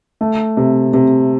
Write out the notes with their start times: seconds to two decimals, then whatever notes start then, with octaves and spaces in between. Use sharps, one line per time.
0.21 A3
0.57 C3
0.93 C3